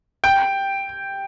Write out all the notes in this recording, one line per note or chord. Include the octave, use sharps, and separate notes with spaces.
G5